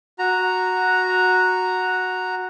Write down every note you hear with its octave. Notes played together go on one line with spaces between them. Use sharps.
F#4 A#5